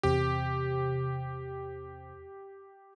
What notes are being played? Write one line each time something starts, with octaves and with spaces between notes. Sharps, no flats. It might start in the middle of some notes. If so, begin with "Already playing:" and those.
E2 C3 G4 C5